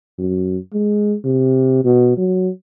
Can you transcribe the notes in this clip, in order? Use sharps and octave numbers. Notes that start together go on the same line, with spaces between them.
F#2
G#3
C3
B2
F#3